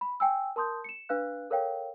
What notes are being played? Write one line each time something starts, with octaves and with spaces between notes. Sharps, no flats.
B5
G5 G#5 E6
A#4 A5 C6 D#6 G6
C#7 E7
D4 B4 F5 F#6
A4 A#4 C#5 F5 G5